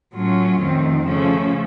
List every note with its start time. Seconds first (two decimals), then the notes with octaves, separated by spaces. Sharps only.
0.15 A2 F#3 A3 C#4 F4
0.61 F2 D#3 A3 C4
1.07 C#3 F3 A3 C#4 A4